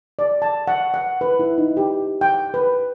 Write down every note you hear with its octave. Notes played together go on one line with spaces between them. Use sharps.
D5
A5
F#5
F#5
B4
E4
D#4
G4
G5
B4